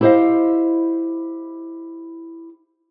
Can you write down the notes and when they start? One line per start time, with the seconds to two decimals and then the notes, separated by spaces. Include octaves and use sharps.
0.01 E4 G4 C5 C#5 D#5 F5